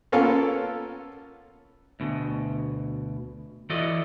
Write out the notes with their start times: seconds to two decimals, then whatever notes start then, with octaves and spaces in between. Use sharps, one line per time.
0.12 A#3 B3 C#4 F4 A4
2.00 D2 B2
3.70 E3 F#4 A4 D5 D#5